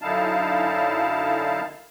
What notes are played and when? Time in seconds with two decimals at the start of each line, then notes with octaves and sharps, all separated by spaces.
0.02 F#2 D3 D#4 E4 F5 A5